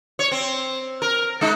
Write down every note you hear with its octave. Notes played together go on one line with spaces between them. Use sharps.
C#5
C4
A#4
G#3 D#4